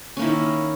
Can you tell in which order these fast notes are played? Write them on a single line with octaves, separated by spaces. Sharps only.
C#4 A#3 E4 D#3